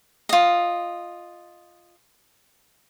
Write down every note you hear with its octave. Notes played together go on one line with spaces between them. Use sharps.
F4 D#5